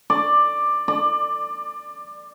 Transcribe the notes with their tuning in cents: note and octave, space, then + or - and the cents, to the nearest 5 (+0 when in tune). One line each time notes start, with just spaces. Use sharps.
D5 +10
D5 +25